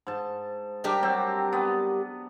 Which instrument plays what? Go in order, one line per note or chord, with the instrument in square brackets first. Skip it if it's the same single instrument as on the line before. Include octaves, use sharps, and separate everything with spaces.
[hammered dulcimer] G#2 A5
[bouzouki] G3 G4 A#4 [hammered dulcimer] D4 G5
[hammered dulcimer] F#3 C4
B3